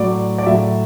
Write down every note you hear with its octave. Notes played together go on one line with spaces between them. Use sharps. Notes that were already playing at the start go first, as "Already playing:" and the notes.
Already playing: A2 F#3 D5
D5
A2 F#3 E5